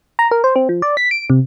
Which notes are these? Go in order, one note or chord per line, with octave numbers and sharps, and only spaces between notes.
A#5
A#4
C5
C4
F3
D5
B6
D7
C3